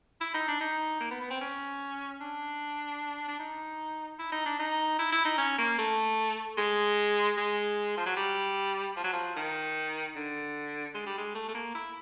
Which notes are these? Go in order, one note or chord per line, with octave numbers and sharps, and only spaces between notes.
E4
D#4
D4
D#4
A#3
B3
B3
C4
C#4
D4
D4
D#4
E4
D#4
D4
D#4
E4
E4
D#4
C#4
A#3
A3
G#3
G#3
F3
F#3
G3
F3
F#3
F3
D#3
D3
G#3
G3
G#3
A3
A3
A#3
E4